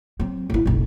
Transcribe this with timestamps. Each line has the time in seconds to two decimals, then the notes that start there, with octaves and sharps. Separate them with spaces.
0.20 F#3 C4
0.50 G#1 E4
0.66 F#1 B1